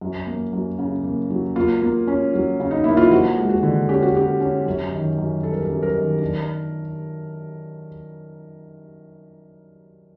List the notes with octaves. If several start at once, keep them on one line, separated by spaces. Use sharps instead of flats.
F#2
A#3
F#2
C#3
A#3
F#3
A#3 F4
A#3
C#4
F#3
C#3
D#4
A#3 E4
F4
F3 F#4
G#3
F#4
D3
C#4 G4
F#4
C#4 G4
C#4
F#2
D#3
F#2
G3 A4
A#4
A4
F#2
A#4
D#3
D4